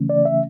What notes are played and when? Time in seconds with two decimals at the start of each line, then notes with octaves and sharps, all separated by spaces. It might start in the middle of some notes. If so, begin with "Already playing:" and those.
Already playing: C#3 E3 A3 C#4
0.09 D5
0.25 E5